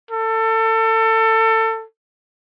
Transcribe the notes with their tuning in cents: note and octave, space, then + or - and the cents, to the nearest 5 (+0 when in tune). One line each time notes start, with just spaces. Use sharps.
A4 +25